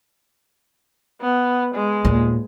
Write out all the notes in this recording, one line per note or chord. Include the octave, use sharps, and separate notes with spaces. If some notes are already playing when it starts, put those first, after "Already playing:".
B3
G#3
D#2 A#2